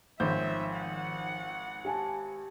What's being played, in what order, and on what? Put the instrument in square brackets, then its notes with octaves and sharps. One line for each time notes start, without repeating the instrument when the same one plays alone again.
[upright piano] G#1 C5 G6 [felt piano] D#3 F3 C#5 [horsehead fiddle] E5
[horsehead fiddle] F#5
[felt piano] G4 G#5 A5